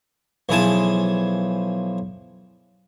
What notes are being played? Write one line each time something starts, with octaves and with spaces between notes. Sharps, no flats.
B1 E3 F3 G#4 G#5 A5